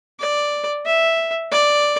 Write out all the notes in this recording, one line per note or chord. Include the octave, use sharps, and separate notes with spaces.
D5
E5
D5